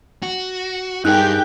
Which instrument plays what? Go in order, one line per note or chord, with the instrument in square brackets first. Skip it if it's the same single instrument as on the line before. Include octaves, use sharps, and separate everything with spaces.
[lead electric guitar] F#4
[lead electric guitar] G2 [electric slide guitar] D#4 G#4 A#4 [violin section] G4 G6 [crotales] F#6